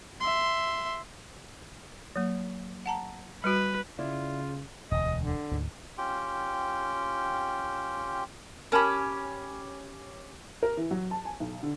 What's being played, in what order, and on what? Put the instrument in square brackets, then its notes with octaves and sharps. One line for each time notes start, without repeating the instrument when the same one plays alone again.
[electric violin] E5 C6
[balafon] F#3 A#3
F#5 A5 A#5
[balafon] G3 F#4 [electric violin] B4
[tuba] C#3 [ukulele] E4 D5 [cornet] F4
[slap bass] E1 D2 [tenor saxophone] D#5
[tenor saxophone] D3
[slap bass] D2 G#2
[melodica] C#4 F4 G4 G5
[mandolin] C#4 G4 [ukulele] A#4 A5 B5
[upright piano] A#4
E3
F#3
A5
G#5
B1
D3